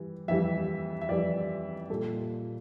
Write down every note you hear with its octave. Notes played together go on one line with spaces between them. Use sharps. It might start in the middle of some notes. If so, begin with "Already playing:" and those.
Already playing: E3 G3
F2 E3 G3 E5
E5
F2 E3 G3 D5
A#2 G3 A4